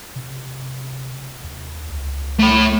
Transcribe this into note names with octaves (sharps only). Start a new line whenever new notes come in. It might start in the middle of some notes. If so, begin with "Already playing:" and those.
C3
D#2
C#2
A3 B5